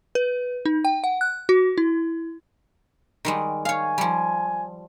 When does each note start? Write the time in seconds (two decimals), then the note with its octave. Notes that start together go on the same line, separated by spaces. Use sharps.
0.15 B4
0.65 D#4
0.85 G5
1.04 F#5
1.21 F#6
1.49 F#4
1.78 E4
3.25 D#3 G3 G#3
3.65 C#5 F5 G#5
3.98 F3 G3